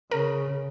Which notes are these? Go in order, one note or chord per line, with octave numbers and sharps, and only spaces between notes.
C#3 A#4